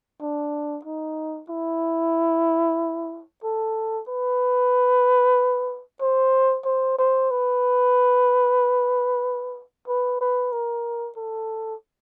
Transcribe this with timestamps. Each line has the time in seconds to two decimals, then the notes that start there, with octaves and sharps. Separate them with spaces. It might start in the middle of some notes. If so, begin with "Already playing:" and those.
0.21 D4
0.85 D#4
1.49 E4
3.44 A4
4.08 B4
6.01 C5
6.65 C5
6.98 C5
7.31 B4
9.88 B4
10.21 B4
10.52 A#4
11.17 A4